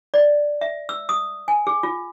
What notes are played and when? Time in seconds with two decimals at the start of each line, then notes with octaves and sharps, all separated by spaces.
0.14 D5
0.61 E5
0.89 E6
1.09 D#6
1.48 G#5
1.67 G#4
1.83 F4